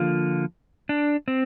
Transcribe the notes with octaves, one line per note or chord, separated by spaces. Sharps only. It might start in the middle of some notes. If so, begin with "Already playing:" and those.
Already playing: D3 F3 A#3 F4
D4
C4